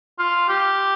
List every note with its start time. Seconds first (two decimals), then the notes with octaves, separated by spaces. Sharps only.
0.19 F4
0.49 G4